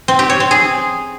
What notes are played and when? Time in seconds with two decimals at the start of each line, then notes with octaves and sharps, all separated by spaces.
0.08 C4
0.19 G4
0.30 C#5
0.40 C4
0.51 G#4